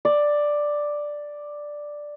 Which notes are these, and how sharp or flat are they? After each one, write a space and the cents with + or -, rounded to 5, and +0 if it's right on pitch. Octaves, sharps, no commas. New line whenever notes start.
D5 +5